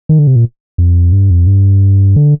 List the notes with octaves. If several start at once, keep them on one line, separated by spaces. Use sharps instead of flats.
D#3
D3
C3
A#2
F2
G2
F2
G2
D3